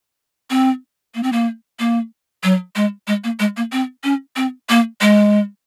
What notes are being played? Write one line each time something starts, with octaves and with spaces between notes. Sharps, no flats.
C4
A#3
C4
A#3
A#3
F#3
G#3
G#3
A#3
G#3
A#3
C4
C#4
C4
A#3
G#3